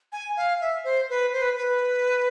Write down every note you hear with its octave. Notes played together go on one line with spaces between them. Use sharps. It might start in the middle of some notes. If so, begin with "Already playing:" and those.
G#5
F5
E5
C5
B4
C5
B4
B4